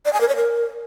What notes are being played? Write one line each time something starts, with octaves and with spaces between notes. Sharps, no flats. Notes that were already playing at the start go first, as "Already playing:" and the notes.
D5
G#5
A#4
C#5
A#4